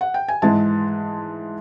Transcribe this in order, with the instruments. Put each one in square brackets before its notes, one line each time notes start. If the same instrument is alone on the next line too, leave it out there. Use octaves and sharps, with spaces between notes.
[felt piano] F#5
G5
G#5
G#2 E3 G#3 A5